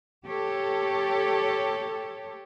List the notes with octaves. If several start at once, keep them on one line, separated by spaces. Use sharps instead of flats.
G4 A4 C#5